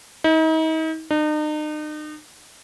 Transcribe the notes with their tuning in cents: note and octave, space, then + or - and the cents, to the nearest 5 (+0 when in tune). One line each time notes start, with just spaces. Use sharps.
D#4 +40
D#4 -40